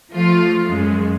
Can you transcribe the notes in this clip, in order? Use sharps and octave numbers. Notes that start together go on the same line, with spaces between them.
F3 A3 F4
F#2 G#3